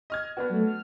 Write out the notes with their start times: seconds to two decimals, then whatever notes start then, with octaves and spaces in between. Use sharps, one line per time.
0.10 D#5 F6 G#6
0.37 B3 D4 F#4 B4
0.50 F#3 A3
0.67 F6